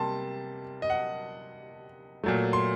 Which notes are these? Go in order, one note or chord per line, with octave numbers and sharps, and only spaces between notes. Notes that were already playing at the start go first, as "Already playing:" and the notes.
Already playing: C3 G3 A#3 A5 C6
D#5
F#5
A#2 F#3 A3
C6